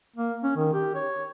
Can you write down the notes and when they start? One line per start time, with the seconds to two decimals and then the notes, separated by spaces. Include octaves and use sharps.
0.16 A#3
0.44 C#4
0.56 D#3
0.73 G4
0.95 C#5